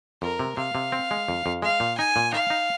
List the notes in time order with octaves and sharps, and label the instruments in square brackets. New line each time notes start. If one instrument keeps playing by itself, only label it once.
[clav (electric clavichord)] F2 [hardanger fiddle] A#4
[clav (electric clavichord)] C3
[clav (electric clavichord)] C3 [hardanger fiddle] F5
[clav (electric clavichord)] C3
C4
G#3
F2
F2
[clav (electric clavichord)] G#3 [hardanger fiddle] F5
[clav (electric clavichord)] A#2
[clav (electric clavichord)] D#4 [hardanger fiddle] G#5
[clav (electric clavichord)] A#2
[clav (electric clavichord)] D#4 [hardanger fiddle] F5
[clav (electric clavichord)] D#4